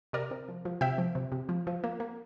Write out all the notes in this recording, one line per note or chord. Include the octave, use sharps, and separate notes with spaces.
C3 A#4 D5
C3
F3
F3
C3 E5 G5
F3
C3
C3
F3
F3
A#3
A#3